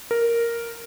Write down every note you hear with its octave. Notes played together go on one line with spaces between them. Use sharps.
A#4